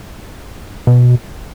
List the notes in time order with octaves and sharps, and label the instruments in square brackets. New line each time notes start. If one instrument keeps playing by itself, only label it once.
[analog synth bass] B2